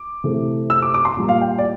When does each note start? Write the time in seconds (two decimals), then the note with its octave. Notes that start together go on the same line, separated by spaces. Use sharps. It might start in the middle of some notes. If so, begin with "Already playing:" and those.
Already playing: D6
0.24 C3 E3 A3
0.70 E6
0.82 D6
0.94 D6
1.05 C6
1.17 A#2 G3 A#3
1.29 F5
1.41 G5
1.58 D5